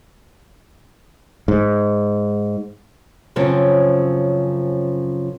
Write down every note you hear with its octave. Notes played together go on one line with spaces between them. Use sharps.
G#2
F#2 C#3 F3 C4